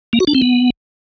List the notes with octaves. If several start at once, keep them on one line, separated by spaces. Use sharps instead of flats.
A#3
F#4
D4
C4
B3